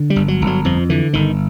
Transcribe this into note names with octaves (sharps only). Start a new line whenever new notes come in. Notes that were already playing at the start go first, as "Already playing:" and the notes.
Already playing: D3
G3
G1
F#3
G1
F#3
F2 F3
D3 E3
G1 D#3